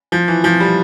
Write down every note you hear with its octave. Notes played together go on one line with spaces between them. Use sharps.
F3
E3
F3
G3